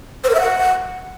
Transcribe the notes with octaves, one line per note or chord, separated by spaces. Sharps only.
C5
A#4
E5
F#5